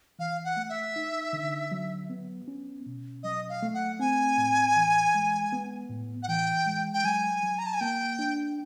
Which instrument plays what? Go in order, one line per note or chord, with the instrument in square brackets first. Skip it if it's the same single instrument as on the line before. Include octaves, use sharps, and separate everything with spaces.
[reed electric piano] E3 [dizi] F5
[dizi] F#5
[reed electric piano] A3
[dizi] E5
[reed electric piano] D#4
D3
F#3
B3
C#4
B2
[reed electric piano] F#3 [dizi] D#5
[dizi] F5
[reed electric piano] A3
[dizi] F#5
[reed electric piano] C4 [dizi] G#5
[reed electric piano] A2
E3
G#3
B3
A2
[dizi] F#5
[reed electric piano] E3 [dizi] G5
[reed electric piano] G#3
[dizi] G5
[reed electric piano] F#3 [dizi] G#5
[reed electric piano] F#3
[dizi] A#5
A5
G#5
[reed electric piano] A#3 [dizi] G5
[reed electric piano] D4